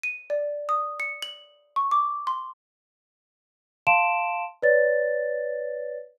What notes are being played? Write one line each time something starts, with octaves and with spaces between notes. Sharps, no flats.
D#7
D5
D#6
C#7
F#7
C#6
D6
C6
F5 A5 C6 D7 E7
B4 C#5 D5 A6